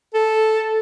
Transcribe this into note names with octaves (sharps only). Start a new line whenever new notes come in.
A4